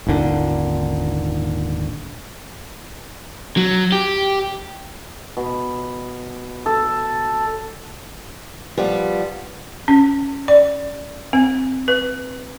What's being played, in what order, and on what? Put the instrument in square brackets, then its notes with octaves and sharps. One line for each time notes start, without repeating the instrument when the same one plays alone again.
[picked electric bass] D#1 G#1 A#2 D3
[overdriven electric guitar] F#3
G4
[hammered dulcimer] B2
A4
[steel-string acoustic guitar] F3 G3 B3 G4
[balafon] C#4
D5
C4
B4